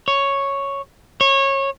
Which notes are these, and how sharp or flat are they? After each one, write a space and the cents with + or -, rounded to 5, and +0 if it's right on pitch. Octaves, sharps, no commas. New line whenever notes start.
C#5 +0
C#5 -25